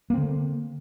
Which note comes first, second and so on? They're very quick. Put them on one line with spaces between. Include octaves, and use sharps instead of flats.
A#3 C4 D3